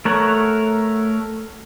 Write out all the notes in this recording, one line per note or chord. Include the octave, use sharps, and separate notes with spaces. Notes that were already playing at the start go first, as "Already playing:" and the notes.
A3 A#4 C#5 F#5